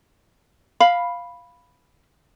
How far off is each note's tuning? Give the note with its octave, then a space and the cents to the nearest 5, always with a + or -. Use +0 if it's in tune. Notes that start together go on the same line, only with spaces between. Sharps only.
F5 +0 B5 +0